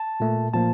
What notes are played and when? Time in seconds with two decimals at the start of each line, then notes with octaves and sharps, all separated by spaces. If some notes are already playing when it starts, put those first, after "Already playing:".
Already playing: A5
0.20 A#2 A3
0.54 A#2 F3 A#3 A5